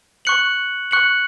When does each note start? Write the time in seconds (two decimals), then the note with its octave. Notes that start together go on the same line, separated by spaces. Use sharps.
0.25 C#6 F#6 C#7 F#7
0.91 C#6 F#6 C#7 F#7